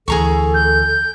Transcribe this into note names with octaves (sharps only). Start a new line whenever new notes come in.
D2 E3 G#4 A4 A#5 C#6
G6